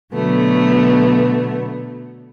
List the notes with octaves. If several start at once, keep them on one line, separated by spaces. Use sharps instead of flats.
B2 D3 F#3 A3 B3